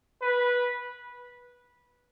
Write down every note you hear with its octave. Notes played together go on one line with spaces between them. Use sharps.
B4